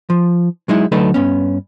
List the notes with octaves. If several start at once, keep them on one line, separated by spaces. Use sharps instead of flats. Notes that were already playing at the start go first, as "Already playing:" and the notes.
F3
F#3 G#3 D#4 E4
D2 F#3 A3 D#4 A4 B4
G2 B3 C#4